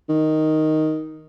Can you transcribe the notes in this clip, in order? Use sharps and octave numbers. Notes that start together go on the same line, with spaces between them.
D#3